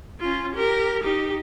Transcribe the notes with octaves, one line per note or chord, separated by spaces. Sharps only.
C#4 F4
G4 A#4
D#4 G4